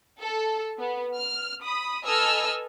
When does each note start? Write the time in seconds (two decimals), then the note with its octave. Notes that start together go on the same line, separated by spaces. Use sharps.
0.20 A4
0.78 B3
1.15 F6
1.62 B5 D#6
2.05 A4 B4 D#5 G#5 E6 F6